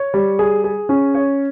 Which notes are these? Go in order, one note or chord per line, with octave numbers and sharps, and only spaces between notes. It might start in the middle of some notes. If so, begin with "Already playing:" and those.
Already playing: C#5
G3
G#4
G#4
C#4
C#5